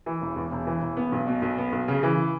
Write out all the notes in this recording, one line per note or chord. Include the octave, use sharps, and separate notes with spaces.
E3
E1
E2
E1
E3
E1
B3
B1
B2
B1
B3
B1
C#3
E3